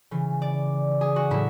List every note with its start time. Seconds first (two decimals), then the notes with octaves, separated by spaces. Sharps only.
0.11 C#3 E3
0.42 D5
1.01 G#4
1.16 F#4
1.30 A2 F#3 E4